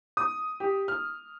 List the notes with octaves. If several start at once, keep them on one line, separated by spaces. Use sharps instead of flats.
D#6
G4
F6